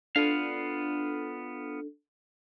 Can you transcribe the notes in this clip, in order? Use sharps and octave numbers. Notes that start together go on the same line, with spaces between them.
B3 D4 F4 A4 F5